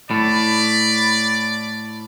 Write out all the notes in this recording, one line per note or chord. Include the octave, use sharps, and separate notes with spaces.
A2 D5 B5